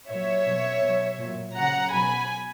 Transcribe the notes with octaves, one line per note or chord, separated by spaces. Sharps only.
A#2 F#3 C#5 E5
B2 F#3
B2 F#3
A#2 F#3
C#3 F#3 F#5 A#5
B2 F#3 G#5 B5